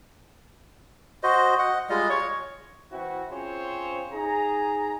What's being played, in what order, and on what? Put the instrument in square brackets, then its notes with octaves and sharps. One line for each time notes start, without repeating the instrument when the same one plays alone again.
[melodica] F#4 C5 D#5
D#5 F#5
G3 G#3 F4 D#5
C#5 C#6
[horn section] E3 C4 E4 F#4
C4 C#4 F4 G#4 C5 C#5
D#4 G#4 A#5